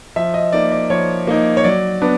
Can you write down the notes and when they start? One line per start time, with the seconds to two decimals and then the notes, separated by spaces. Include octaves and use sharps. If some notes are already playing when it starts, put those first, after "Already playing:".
0.16 F3 E5
0.34 D#5
0.53 A#3 D#4 D5
0.72 D5
0.90 F3 C#5
1.27 A#3 D#4
1.57 C#5
1.64 F#3 D5
2.02 B3 D4